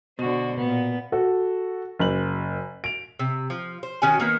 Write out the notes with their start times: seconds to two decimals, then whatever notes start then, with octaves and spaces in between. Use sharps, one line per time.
0.19 B2 D3 F#4 C5
0.59 A#2 B3
1.12 F#4 A4
1.99 F#1 F#7
2.84 D7 F7
3.19 C3
3.50 F3
3.83 C5
4.02 D#3 C#4 F#4 G#5
4.20 D#3 A#3 B3